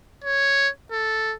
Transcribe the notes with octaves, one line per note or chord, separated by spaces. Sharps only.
C#5
A4